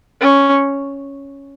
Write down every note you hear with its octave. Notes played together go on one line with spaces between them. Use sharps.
C#4